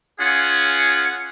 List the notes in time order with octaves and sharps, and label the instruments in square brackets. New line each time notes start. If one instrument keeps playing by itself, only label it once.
[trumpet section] C#4 F4 G#4 F#5